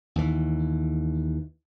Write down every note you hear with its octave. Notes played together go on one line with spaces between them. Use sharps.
D#2 E3